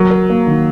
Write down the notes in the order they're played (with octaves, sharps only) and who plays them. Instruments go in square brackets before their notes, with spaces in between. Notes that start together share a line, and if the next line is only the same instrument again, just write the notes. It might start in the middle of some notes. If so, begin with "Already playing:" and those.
Already playing: [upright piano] F#3 [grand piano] A#4
[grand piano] A#4
A#3
D#3